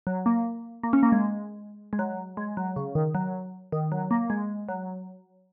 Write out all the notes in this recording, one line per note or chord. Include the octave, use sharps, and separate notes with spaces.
F#3
A#3
A#3
C#4
A#3
G#3
G#3
F#3
G#3
F#3
C#3
D#3
F#3
D#3
F#3
A#3
G#3
F#3